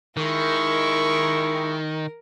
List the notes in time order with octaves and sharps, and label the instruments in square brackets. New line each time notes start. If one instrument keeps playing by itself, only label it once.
[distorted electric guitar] D#3 [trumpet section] G#3 E4 C#6 [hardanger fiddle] A#4